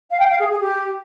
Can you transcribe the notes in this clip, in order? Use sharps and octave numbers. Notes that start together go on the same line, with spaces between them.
F5
G5
F5
G#4
G#4
G4